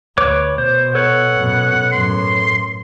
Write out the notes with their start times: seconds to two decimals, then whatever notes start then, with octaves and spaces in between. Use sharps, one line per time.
0.18 D2 B4 C#5 D6
0.58 B2 C5
0.95 A4 B4 C#5 F#5
1.36 F#2 B2
1.92 F#2 A2 C6